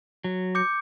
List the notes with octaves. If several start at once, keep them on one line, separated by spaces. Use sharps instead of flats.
F#3
D6 G6 C#7